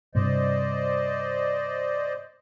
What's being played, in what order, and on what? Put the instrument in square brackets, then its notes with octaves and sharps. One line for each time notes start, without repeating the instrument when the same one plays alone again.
[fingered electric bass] G2 C3 [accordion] C5 D5 D#5